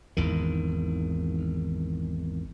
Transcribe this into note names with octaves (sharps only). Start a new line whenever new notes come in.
G#1 E2 D#3